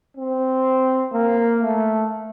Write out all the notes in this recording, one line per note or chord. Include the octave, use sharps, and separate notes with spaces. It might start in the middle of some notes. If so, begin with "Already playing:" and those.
C4
A#3
A3